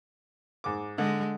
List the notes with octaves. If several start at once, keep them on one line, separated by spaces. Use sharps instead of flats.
G#2 D6
D3 G#3